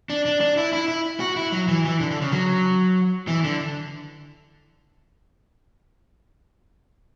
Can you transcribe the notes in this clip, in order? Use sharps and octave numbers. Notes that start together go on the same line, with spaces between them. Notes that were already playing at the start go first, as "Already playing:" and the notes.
D4
D4
D4
E4
E4
E4
F#4
E4
F#3
E3
E3
D3
D3
C#3
F#3
E3
D3